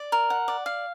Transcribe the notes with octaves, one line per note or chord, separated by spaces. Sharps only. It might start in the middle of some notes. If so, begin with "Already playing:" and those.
Already playing: D5
A#4
F#5
D5
F5